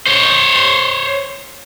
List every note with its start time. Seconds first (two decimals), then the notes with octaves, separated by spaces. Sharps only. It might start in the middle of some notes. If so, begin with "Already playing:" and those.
0.07 C5 C#5